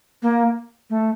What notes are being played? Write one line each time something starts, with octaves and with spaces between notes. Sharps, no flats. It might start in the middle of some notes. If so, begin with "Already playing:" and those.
A#3
A3